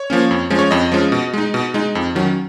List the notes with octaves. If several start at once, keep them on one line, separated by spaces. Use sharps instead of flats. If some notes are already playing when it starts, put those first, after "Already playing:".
Already playing: C#5
F3 A#3 C#4
F2
F3 G#3 C#4
C#5
F2 D#5
F3 G#3 C#4
B2
G#3 D#4
B2
G#3 D#4
F2
D#3 F#3 C#4